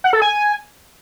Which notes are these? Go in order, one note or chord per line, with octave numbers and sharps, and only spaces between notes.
F#5
A4
G#5